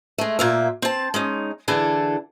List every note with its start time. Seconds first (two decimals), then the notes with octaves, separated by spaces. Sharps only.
0.18 G#3 A3
0.39 A#2 A#3 E5
0.82 C4 A5
1.14 G#3 C#4 D#4
1.68 D3 E3 G#4 A4